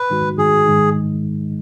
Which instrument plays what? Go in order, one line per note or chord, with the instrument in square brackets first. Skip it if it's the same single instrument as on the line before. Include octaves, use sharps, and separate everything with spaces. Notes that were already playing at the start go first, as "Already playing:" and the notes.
Already playing: [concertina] B4
[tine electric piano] G#2 D#3 G#3 D#4 F#4
[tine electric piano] G#2 D#3 G#3 D#4 F#4 [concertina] G#4
[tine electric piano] G#2 D#3 G#3 D#4